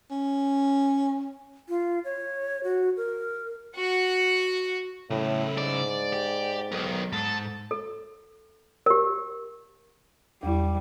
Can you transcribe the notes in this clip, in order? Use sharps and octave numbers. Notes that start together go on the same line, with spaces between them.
C#4
F4
C#5
F#4
A#4
F#4 F#5
A2 C#3 E4
G#2 D5
G4
B1 A#4 D#5
G#2 A4
A4
G4 A#4
E2 G3 E4